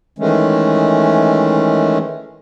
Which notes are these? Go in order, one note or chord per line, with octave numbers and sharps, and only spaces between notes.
D#3 E3 G#3 A3 C#4